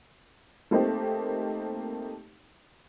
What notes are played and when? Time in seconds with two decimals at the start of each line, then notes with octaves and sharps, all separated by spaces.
0.71 A3 A#3 C4 D#4 G4